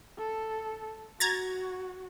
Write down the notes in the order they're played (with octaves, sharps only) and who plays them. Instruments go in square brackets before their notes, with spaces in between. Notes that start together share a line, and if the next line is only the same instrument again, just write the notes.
[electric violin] A4
[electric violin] F#4 [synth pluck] A#5 G#6 A6